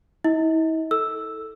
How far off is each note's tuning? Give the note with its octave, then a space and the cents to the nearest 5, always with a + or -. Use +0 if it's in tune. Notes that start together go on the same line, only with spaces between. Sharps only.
E4 -40 D#5 +40
A4 +0 E6 +0